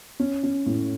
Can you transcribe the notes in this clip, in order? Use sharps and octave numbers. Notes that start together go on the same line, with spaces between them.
C#4
C#4
A2